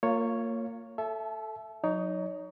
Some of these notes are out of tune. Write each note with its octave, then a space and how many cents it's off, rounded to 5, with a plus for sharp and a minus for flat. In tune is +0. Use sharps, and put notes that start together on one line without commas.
A#3 -20 F4 +10 C#5 +0
A4 +0 E5 +10 A5 -35
F#3 -30 D#4 +0 C#5 +30